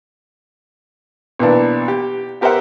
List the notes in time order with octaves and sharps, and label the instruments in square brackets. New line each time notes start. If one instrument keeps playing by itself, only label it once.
[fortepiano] B1 E3 A#3 D4
G4
B3 G4 A#4 C5 E5 F#5